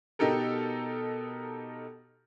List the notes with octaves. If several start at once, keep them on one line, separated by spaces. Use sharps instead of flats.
B2 D#4 G4 A4 A#4